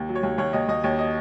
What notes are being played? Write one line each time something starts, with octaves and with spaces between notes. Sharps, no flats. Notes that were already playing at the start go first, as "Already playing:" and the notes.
Already playing: D#2
F#3
C#5
D#2
D#2 C#5
D#2 D#5
D#2 D#5
D#2 C#5
D#5